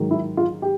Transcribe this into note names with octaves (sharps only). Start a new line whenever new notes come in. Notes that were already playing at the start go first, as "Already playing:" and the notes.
Already playing: G#2 D#3 F#3
E4
F4
G4